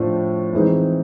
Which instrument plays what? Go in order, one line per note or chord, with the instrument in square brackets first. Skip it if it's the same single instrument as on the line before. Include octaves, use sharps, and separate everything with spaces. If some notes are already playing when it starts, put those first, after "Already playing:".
Already playing: [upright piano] A2 F3 A3 D4
E3 G#3 C4 D#4